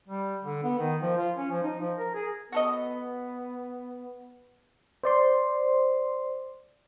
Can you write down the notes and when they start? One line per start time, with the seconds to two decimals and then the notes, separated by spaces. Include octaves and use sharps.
0.08 G3
0.44 D3
0.63 B3
0.79 D#3
1.02 F3
1.17 F4
1.37 C#4
1.51 F3
1.63 D#4
1.80 F3
1.98 A#4
2.15 G#4
2.52 B3 F#4 A4 D#5
5.04 C5 D5 C6